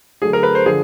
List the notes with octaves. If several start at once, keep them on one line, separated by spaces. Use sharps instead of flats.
D3 F#3 A3 G#4
A#4
B4
C5
D3 F3 G#4